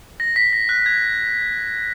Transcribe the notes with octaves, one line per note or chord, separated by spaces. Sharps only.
A#6
B6
A#6
F#6
G#6